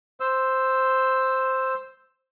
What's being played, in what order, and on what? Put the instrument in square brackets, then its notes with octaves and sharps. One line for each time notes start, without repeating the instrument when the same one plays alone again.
[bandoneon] C5 E6